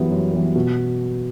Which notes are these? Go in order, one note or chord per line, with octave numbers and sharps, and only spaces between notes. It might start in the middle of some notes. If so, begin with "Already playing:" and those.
Already playing: F#2 E3 G3 B3
F#2
E3 G3 B3
B2